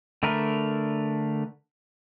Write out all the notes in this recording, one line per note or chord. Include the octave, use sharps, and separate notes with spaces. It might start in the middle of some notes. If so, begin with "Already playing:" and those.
D3 A3 D4 A#4 B4